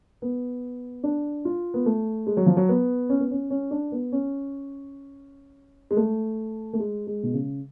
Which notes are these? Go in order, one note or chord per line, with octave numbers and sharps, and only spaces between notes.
B3
D4
F4
B3
A3
G#3
F#3
F3
F#3
B3
C#4
B3
C#4
C#4
D4
B3
C#4
G#3
A3
A3
G#3
G#3
B2
C#3